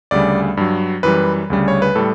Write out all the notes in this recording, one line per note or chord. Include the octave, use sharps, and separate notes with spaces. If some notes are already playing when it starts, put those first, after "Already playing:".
D2 C#3 G3 D5
G2 F#3
F#2 E3 G3 B4
D2 C#3 G3
C#5
B4
A2 G3 A4